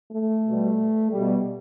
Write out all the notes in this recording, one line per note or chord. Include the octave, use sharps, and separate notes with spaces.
A3
B2 G3
B2 G3